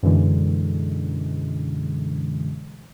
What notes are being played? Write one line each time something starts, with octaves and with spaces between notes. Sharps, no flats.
F#2 B2 D3 E3 G#3